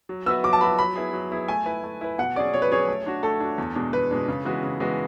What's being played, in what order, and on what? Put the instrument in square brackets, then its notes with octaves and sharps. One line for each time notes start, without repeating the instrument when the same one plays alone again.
[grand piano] F#3
[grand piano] B3 F#4 B4 E5 [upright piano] E6
[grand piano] F#3 [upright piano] D6
[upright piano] A5
[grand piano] B3 F#4 B4 E5 [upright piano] B5
[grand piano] F#3 [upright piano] B5
[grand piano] B3 E4 G#4
F#3
B3 E4 G#4
[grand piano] A3 [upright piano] G#5
[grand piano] E4 B4
A3
E4 B4
[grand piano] B2 [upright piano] F#5
[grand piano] F#3 C#4 G#4 [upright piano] D5
[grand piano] B2 [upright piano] C#5
[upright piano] B4
[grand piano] F#3 C#4 G#4 [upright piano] C#5
[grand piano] A3
D4 F#4
[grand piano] A3 [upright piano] A4
[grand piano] D4 F#4
E2
B2 G#3 D4
[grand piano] E2 [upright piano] B4
[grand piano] B2 G#3 D4
C#3
E3 G#3 B3 F#4
C#3
E3 G#3 B3 F#4